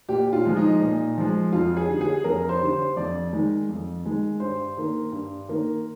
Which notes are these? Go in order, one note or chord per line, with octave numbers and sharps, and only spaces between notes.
A#2 G4
F4
F3 G#3
D#4
A#2
F3 G#3
F2 F4
G#4
D3 G3
G#4
F2 A#4
C5
D3 G3
C5
F2 D5
D#3 G#3
F2
D#3 G#3
G2 C5
D#3 A#3
G2
D#3 A#3